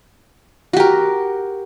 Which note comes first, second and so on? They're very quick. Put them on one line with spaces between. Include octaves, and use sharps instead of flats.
F#4 G4 A#4